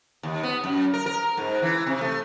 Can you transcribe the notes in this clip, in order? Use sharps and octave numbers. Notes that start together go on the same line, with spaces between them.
D#2
B3
F#2
A#4
A#4
G#2
E3
C3
A3